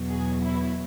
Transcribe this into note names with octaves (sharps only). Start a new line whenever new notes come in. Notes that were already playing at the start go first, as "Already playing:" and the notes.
Already playing: E2 B2 F#3
G#4
E4